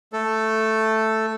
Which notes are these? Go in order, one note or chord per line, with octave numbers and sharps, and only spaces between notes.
A3 A4